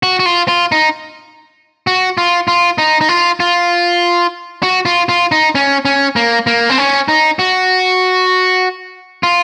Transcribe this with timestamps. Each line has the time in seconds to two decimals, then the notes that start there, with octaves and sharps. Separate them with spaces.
0.03 F#4
0.20 F#4
0.26 F4
0.48 F4
0.72 D#4
1.87 F#4
2.18 F4
2.48 F4
2.78 D#4
3.01 D#4
3.09 F4
3.40 F4
4.63 F#4
4.85 F4
5.09 F4
5.32 D#4
5.55 C#4
5.85 C#4
6.16 A#3
6.47 A#3
6.70 C4
6.78 C#4
7.08 D#4
7.39 F#4
9.23 F4